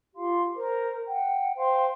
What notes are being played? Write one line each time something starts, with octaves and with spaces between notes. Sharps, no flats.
F4 G4 F5 C6
A#4 C5
F#5 G5
C5 F5 G5 C6